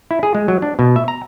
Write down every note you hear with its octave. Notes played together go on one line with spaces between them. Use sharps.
E4
G#4
G#3
F#3
D4
B2
E5
A#5